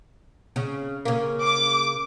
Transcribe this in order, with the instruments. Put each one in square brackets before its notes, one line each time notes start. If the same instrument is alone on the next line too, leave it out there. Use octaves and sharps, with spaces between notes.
[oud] C#3
C#3 A#3
[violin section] D6